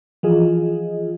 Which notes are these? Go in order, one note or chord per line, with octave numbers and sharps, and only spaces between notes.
E3 F3 F4 G#4 D#5